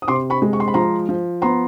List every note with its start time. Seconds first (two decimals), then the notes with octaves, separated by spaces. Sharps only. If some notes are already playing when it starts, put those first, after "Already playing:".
0.02 D#6
0.08 C3 C6 D6
0.30 B5 C#6
0.42 G#3
0.53 C#6
0.60 C6
0.68 B5
0.74 F3 A#5 C6
1.09 F3
1.42 B3 A#5 C6